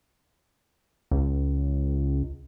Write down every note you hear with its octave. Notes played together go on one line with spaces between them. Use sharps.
C#2